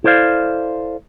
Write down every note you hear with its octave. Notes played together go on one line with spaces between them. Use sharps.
E4 A4 C5 D5 F5